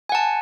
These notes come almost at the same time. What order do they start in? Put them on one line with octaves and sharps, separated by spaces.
G#5 F#5 A5